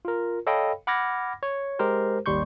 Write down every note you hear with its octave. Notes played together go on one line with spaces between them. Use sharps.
F4 A#4
A4 C#5 D#5 F5 G5 B5
F#5 B5 D6 F6 G#6 A#6
C#5
G#3 G4 A#4 C5
G#1 D#2 G3 C6 C#6 G6